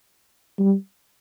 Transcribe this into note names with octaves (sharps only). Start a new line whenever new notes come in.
G3